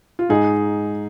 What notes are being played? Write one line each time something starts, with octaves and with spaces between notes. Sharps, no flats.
F4
G#2 D#4 G#4